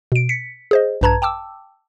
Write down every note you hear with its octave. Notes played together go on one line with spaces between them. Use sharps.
B2 D7
B6 C#7
G#4 C5 D#5
A#1 G2 B4 A5 A#5 G#6
G5 A5 D6 E6